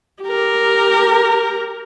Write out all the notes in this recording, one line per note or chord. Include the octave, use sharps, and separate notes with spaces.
G4 A#4